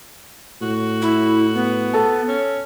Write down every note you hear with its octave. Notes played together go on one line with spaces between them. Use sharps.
A2 F#4
E4
B3
A4 A5
C#4